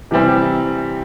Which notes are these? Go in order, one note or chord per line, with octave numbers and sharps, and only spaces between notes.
C3 E3 G3 C4